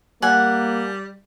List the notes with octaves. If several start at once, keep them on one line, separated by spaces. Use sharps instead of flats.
G3 A#3 F#5 G#5